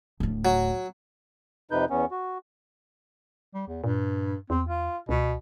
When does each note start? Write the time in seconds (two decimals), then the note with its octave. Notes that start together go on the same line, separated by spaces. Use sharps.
0.20 D1 A2
0.45 F#3
1.71 F2 C3 D#4 B4 G6
1.90 E2 B3 C#4
2.11 F#4
3.55 G3
3.67 E2
3.84 G2 A#2
4.50 E2 C4
4.69 F4
5.09 C#2 B2